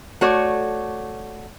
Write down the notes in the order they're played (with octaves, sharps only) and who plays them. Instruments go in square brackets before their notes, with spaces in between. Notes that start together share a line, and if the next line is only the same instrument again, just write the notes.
[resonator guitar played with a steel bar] A3 F#4 C#5 D5